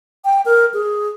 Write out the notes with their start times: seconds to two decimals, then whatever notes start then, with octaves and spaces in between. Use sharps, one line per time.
0.25 G5
0.46 A#4
0.74 G#4